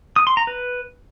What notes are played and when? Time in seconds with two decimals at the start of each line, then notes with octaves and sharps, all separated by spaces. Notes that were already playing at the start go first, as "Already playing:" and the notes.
0.16 D#6
0.27 C6
0.37 A#5
0.47 B4